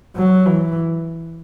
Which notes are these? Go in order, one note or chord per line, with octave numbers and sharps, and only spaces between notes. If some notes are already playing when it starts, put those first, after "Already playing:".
F#3
E3